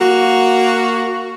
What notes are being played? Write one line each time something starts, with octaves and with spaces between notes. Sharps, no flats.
A#3 F#4